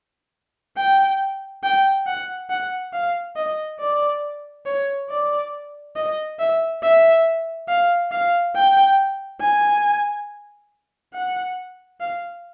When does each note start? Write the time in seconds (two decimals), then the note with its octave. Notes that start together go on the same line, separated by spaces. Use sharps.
0.77 G5
1.63 G5
2.06 F#5
2.50 F#5
2.93 F5
3.36 D#5
3.80 D5
4.66 C#5
5.10 D5
5.96 D#5
6.39 E5
6.83 E5
7.68 F5
8.12 F5
8.55 G5
9.41 G#5
11.14 F#5
12.01 F5